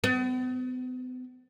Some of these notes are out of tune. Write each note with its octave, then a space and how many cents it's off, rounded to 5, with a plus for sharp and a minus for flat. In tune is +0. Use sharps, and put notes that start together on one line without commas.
B3 +40